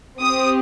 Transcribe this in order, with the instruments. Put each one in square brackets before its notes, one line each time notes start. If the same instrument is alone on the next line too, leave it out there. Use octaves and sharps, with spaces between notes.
[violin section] C4 G4 D#6